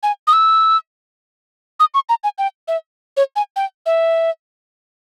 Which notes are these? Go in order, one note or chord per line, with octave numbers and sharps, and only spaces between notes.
G#5
D#6
E6
D#6
C#6
A#5
G#5
G5
E5
C#5
G#5
G5
E5